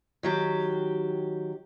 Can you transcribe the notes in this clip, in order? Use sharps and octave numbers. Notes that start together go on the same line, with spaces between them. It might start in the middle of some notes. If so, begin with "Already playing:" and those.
D#3 F#3 G4